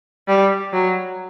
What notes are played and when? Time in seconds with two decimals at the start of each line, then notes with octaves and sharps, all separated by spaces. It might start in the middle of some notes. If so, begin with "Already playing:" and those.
0.28 G3
0.73 F#3